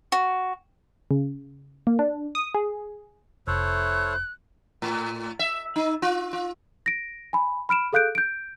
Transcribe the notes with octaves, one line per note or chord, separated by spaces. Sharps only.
F#4
C#3
A#3
D4
D#6
G#4
F1 A3 E4 A4 C5 C#5 F#6
A2
E5
D#4
F4
F4
A#6 D7
G#5 B5
B5 F6 D7 E7
G#4 A4 F5 F#6 G6 D7
G6 D7